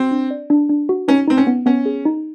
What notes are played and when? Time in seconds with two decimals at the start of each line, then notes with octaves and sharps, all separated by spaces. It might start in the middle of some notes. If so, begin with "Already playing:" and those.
Already playing: C4 F#4
0.11 D4
0.31 D5
0.50 D4
0.69 D4
0.89 F#4
1.08 C#4 D#4
1.28 C4 D#4
1.37 C#4
1.47 B3
1.66 B3 C#4
1.86 G#4
2.05 D#4